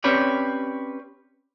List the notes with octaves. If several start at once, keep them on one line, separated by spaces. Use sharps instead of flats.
C4 C#4 G4 B4 C#5 D5